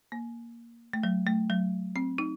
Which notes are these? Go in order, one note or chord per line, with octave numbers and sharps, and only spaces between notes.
A#3
A3
F#3
A3
F#3
C4
D#4